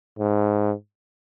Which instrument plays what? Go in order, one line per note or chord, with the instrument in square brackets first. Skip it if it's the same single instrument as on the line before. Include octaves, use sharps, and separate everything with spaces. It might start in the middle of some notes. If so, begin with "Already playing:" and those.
[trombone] G#2